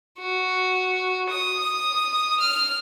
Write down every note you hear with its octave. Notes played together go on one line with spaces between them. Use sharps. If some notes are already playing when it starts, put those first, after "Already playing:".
F#4
D#6
F6